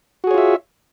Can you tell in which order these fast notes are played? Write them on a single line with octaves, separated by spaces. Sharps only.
F#4 G#4 C#5 F4 E5